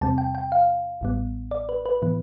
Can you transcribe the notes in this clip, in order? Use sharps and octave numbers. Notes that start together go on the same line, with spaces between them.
E2 C3 G3 C4 A5
G5
G5
F5
A1 A2 G3 B3
D5
B4
B4
A2 E3 B3